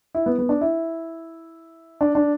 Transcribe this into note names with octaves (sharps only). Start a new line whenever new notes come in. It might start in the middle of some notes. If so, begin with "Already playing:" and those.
E4
B3
B3
D4
E4
D4
D4